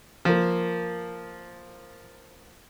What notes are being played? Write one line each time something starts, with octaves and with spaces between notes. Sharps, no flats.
F3 A#3